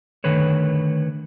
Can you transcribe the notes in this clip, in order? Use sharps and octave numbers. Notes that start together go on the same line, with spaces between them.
D3 D#3 A3 B4 C#5